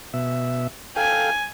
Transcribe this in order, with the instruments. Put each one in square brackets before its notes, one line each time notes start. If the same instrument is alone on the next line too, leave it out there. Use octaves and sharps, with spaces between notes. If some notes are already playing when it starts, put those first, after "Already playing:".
[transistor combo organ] B2 E5
[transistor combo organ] A4 F5 G5 [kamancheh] G#5